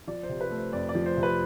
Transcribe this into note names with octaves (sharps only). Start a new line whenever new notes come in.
F3 D5
C5
C3
B4
A3
C5
F2 D5
D5
F3
C5
C3
B4